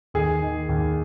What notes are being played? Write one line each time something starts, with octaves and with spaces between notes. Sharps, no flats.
D#2 G#4
D#3
D#2